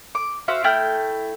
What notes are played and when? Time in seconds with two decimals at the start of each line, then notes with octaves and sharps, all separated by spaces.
0.15 D6
0.48 F#4 C5 E5 F5
0.64 A3 E4 G5 F6